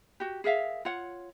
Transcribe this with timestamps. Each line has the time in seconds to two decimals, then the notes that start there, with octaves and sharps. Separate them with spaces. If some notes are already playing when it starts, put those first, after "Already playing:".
0.20 F#4 G4
0.44 G#4 A#4 E5 F5
0.85 F4 C#5 F#5